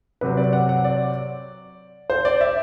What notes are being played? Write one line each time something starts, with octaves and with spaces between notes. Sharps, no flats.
C3 F#3 C4 B4
D5
F#5
F#5
D5
C5
D5
E5